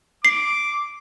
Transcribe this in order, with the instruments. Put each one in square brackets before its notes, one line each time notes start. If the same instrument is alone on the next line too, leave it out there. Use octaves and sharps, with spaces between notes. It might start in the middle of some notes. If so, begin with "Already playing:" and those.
[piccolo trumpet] D6 [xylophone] C7